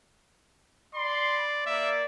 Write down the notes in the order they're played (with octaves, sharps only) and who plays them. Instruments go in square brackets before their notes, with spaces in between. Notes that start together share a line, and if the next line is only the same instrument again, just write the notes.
[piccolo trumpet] D5 [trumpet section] B5 C6
[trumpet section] A#3 A#4 D5 [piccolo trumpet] E5